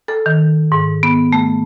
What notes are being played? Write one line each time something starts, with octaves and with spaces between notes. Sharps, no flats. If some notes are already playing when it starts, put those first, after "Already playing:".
A4
D#3
G#2
B3
A3